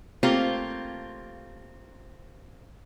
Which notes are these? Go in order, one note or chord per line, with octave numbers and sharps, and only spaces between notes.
A3 A#3 C4 F4 G4